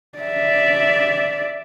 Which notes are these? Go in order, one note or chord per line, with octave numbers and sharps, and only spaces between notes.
D5 E5